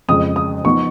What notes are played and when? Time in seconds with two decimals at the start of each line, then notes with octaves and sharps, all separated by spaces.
0.08 F2 C#3 G#3 D#6
0.36 D#6
0.65 F3 B3 D#4 C#6